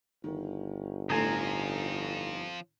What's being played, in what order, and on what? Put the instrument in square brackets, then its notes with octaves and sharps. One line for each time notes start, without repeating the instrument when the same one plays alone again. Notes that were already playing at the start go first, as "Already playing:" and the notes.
[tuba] G1 [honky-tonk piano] D#3
[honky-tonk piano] A2 D3 [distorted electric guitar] F3 C4 [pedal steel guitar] D#4 G#5 A#5